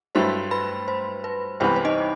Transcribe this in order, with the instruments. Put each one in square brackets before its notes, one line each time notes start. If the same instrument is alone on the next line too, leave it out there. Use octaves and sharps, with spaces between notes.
[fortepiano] G2 F#3 A3 E4 [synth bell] C5 C6
[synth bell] B4 B5
C5
B4
[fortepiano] C2 C3 E3 B3 [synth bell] C5
[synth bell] C5
D#4 D#5